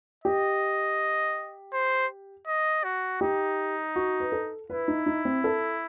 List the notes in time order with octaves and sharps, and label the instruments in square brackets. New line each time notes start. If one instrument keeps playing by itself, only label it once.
[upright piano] G4 [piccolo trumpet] D#5
[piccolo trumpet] C5
D#5
F#4
[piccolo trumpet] D#4 [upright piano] G4
[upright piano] F#4
B4
A4
[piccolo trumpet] E4 [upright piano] B4
[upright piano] D#4
D#4
C4
A4